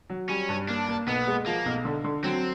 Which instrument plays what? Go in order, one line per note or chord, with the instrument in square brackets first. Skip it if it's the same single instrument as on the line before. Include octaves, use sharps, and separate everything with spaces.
[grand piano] F#3
[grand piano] G3 [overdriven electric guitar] C#4
[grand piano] G2
[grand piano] A#3 [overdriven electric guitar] D4
[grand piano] A#3
[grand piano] B1 [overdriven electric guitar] B3
[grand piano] G#3
[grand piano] F3 [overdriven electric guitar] A#3
[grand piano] B1
D3
D3
[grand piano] F#3 [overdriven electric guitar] C4